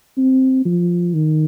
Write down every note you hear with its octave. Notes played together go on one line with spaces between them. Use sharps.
C4
F3
D#3